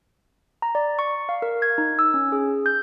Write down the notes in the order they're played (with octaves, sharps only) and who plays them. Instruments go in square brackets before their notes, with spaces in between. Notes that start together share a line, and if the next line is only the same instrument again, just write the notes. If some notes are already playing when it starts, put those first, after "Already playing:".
[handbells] A#5
D5
C#6
F5
A#4
G#6
D#4
E6
C#4
G#4
G6